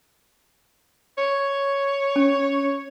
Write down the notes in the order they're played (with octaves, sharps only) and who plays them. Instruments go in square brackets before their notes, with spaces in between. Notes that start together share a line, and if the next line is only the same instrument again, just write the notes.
[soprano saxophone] C#5
[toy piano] C#4